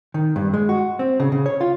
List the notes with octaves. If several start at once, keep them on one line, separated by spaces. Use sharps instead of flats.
D#3
G2
G#3
F#4
C4
C#3
C#3
C#5
F4